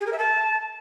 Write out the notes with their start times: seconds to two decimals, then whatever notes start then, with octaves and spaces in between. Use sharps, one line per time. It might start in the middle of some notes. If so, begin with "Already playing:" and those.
0.01 G#4
0.07 A#4
0.13 E5
0.18 A5